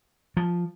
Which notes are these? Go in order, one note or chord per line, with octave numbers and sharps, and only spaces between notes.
F3